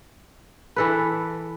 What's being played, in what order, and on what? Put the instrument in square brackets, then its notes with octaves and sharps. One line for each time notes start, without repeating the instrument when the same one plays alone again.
[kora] E3 A4 B4